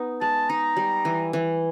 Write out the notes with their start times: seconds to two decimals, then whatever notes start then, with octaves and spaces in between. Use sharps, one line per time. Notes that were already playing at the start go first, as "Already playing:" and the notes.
Already playing: B3 D#4
0.21 G#3 A5
0.49 D#4 A#5
0.77 G3
1.05 E3
1.33 E3